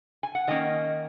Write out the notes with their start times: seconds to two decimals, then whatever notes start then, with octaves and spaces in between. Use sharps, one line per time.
0.23 G#5
0.35 F#5
0.47 D#3 A#3 C#4 D#5